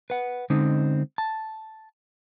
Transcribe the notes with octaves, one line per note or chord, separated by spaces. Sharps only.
B4 F#5
D3 G#3 C4 C#4 D#4
A5